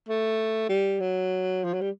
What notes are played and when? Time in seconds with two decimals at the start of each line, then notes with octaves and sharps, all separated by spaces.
0.09 A3
0.69 G3
1.00 F#3
1.64 F3
1.73 F#3
1.81 G3